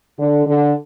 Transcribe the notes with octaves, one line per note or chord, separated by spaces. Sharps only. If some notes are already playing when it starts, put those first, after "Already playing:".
D3
D3